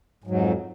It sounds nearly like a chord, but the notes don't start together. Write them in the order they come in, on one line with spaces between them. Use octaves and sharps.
G#2 F#3 F2